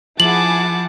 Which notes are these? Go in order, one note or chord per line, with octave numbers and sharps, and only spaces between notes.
F3 E4 G#4 F#5 A5 D6 F#7